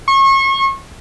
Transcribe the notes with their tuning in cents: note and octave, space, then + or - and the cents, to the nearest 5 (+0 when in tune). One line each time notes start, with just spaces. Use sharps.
C#6 -35